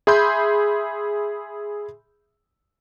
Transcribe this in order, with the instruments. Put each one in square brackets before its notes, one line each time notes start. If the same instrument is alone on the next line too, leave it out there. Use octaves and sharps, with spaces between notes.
[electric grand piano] G#4 E5 B5 C6 G6